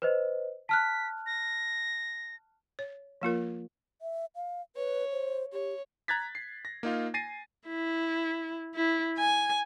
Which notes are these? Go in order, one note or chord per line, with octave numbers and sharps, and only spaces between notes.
B4 C5 D#5
A5 F6 F#6 B6
A#6
C#5
F3 A#3 F4 A#4
E5
F5
B4 C#5
C5
G4 C#5
A#5 F#6 G#6 A6 B6
C7
A#6
A#3 D#4 F4
G#5 A6 A#6 C7 D#7
E4
E4
G#5